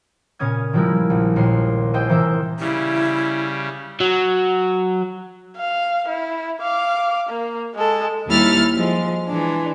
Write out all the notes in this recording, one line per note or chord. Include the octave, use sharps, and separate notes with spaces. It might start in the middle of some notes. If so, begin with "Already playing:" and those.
A#2 C#3 C#4 D#6 G#6
D#3 F3 G3 G#3 E4 A#4
A#1
D#2 A#2 D#4 C6 C7
E4 G#4 C5 D#5 G5 C6
C3 E3 A#4 C5 E5 D#6
C#3 G3 E4
F#3
F5
E4
F5 D6
A#3
G#3 A4
D#2 G3 D#4 E4 F6 A6
F3 G#3
E3 G#3 D4